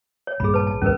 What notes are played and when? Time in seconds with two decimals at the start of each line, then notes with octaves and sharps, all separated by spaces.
0.27 C#5
0.40 A#1 G2 G#4 B5
0.54 B4 A5
0.67 A5
0.82 D#1 C#2 G2 C#4 A#4 B4